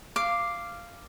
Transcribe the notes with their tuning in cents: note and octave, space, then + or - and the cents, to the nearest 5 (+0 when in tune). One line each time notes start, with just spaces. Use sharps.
F5 -10 D6 +0